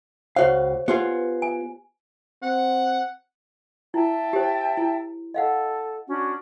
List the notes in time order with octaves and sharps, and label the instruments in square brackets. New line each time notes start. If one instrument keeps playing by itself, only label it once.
[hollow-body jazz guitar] C#2 F#4 F5 [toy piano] C5 C#5
[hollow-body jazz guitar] B3 F4 G#4 [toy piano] G4 B4
[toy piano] G#5
[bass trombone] C4 [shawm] F#5
[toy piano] E4 [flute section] E5 G5 A5
[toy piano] G4 C5
E4
[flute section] A4 [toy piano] D#5 F5 F#5
[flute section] C#4 D4 F#4